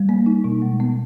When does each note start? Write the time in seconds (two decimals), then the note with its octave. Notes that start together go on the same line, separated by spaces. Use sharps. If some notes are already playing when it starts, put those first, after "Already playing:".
Already playing: G3
0.09 A#3
0.26 D#4
0.44 B2
0.62 G#3
0.80 B3